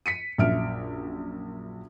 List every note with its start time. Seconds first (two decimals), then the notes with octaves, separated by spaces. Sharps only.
0.06 B6 C#7 D#7
0.38 A#1 F#2 E5 F6 D7